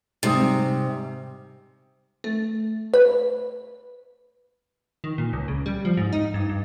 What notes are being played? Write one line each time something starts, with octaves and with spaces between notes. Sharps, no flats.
G#2 C3 G3 D#6
A3
B4
D#3
A#2
C#2
C#3
G3
F3
G#2
D#4
G2
G2